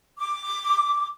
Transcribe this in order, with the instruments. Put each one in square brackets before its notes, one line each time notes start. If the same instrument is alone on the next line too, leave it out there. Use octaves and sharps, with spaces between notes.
[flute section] D6